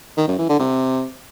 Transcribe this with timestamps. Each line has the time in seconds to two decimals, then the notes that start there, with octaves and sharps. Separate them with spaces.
0.17 D#3
0.28 F#2
0.38 E3
0.49 D3
0.60 C3